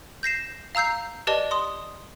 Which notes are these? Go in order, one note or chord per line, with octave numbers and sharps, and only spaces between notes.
G6 A#6 C7 E7
F5 A#5 E6 G6 C7
G4 B4 D5 D#5 A5 G7
C6 D#6